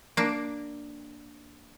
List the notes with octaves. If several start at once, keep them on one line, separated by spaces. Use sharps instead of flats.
A#3 D4